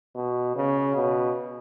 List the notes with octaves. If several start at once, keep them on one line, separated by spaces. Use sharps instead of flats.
B2
C#3
B2